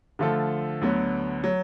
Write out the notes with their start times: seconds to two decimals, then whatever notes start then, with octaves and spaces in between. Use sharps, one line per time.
0.19 D3 F3 A3 F4 A4
0.82 D2 D3 F#3 B3
1.44 F#3